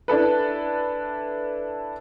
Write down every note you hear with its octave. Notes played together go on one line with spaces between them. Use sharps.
D4 E4 A4 B4